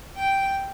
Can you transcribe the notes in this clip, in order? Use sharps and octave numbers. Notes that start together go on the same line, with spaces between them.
G5